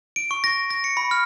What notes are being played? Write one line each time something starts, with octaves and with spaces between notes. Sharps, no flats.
D7
C#6
A#6
A#6
C#7
B5
F6